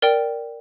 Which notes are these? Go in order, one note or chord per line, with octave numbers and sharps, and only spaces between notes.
A#4 D5 G5